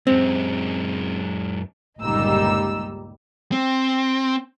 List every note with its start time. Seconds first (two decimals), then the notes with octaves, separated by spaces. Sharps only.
0.07 F#2 G#3 C4
2.00 G1 C#2 A#2 G3 D#4 E6
3.52 C4